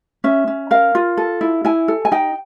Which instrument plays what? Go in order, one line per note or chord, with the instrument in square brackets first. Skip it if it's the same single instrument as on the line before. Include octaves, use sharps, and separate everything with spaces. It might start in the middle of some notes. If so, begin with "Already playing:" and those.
[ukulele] C#4 E5
C#4
A#4 F5
F4
A4
E4
E4 G#5
A4
G#5
D#4 G5